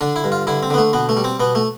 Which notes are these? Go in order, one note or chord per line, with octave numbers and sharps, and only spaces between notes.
D3 D4
E4
G2
F4
D3 E4
C4
D3 B3
A3
B2 B3
A3
G3
C4
B2 B3
A3